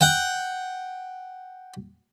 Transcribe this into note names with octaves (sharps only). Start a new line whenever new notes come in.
F#5 G5